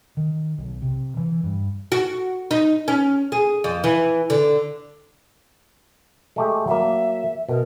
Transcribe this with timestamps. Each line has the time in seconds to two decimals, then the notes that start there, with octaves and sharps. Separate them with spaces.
0.17 D#3
0.58 B1
0.82 C3
1.17 E3
1.44 G2
1.92 F#4
2.51 D#4
2.88 C#4
3.32 G#4
3.64 F2
3.84 E3
4.30 D3
6.36 G#3 A3 G4
6.67 F#3 A#3 E5
7.49 B2 A#4